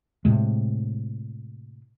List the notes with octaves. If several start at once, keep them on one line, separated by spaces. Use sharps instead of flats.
A2 C3 G#3